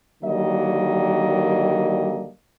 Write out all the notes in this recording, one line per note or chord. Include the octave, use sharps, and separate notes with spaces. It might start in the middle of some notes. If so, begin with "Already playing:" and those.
D3 D#3 F#3 G3 A#3 D#5